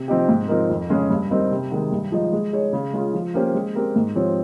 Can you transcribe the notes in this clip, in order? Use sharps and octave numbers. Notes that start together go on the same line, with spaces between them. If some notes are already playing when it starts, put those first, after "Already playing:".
Already playing: C3
F3 C4 D#4 G4
G#2
F3 C4 D#4 A#4
F2
C#3 G#3 C#4 G#4
G2
G3 C4 D#4 A#4
C3
D#3 G#3
G2
F3 G#3 D#4
G#3
D#4 G#4 C#5
C#3
G#3 C#4 F4
F3
A#3 C#4 G4 C5
G#3
C4 G4 A#4
G#2
F3 C4 G4 C#5